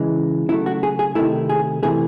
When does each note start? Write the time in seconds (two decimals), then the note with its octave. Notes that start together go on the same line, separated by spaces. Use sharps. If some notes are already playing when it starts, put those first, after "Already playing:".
Already playing: C#3 E3 G#3
0.49 C#3 F#3 A3 E4
0.66 F#4
0.83 G#4
0.99 G#4
1.15 C3 D#3 A3 E4
1.49 G#4
1.83 C3 E3 A3 G#4